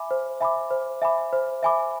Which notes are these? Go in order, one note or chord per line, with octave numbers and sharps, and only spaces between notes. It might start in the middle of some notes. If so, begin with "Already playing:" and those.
Already playing: E5 G#5 B5 D6
C5
E5 G#5 B5 D6
C5
E5 G#5 B5 D6
C5
E5 G#5 B5 D6